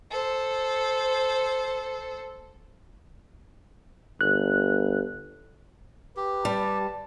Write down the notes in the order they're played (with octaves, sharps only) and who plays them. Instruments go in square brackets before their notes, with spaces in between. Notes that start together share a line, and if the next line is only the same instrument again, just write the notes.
[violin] A4 C5
[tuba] G1 [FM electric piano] F#6
[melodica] G4 [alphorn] B4
[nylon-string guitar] G3 [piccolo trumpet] A5